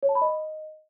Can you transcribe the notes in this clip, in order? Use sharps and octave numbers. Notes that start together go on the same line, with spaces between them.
C#5
A5
B5
D#5